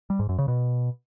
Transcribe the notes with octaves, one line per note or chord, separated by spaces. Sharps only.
G3
G#2
F#2
C#3
B2